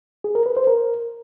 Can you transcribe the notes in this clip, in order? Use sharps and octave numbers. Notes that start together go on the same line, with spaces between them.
G#4
A#4
B4
C5
A#4